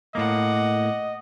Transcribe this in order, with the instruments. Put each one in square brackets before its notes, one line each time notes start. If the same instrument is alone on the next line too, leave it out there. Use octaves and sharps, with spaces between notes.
[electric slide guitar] A2 A#3 [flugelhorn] D#5 [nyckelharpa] F#5 D6